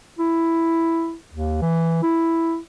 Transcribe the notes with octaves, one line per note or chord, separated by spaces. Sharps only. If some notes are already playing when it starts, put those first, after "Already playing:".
E4
D#2
E3
E4